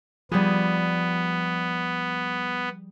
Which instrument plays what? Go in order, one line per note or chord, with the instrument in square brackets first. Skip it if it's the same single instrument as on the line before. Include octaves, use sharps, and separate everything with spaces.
[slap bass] F3 [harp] G3 G#4 [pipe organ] B3